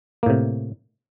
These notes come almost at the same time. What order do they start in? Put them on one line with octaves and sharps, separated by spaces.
A#3 A2 C3